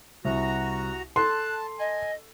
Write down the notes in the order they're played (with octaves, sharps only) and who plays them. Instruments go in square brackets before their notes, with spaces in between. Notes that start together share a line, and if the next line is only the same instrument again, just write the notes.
[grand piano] C2 [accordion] F#4 A#5
[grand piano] A4 [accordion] A5 [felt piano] C6 [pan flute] F#6
[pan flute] D#5 [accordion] G#5